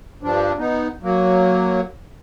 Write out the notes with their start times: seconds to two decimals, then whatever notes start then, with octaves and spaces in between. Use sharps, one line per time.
0.23 G2 F3 D4
0.59 B3 D#4
1.03 F#3 A#3